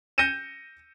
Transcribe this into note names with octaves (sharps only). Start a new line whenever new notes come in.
G6 A#6 C#7 D#7 E7